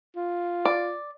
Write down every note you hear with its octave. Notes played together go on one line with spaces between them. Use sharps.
F4
D5